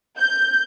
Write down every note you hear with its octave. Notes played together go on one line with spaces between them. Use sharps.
G6